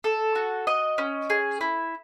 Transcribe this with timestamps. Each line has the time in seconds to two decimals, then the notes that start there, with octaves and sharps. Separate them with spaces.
0.04 A4
0.35 F#4
0.67 D#5
0.98 C#4
1.30 G#4
1.61 E4